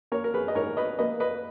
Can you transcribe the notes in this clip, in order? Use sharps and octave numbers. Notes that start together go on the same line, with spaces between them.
A#3 A#4 C#5
A#4
G#4 B4
D#5
G#2 A#4 C#5
B4 D#5
A#3 B4 D#5
B4 D#5